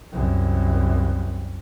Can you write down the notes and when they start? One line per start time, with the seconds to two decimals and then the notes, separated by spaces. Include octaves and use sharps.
0.12 C2 F#2